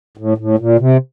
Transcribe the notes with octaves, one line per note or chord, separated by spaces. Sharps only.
A2
A2
A#2
C3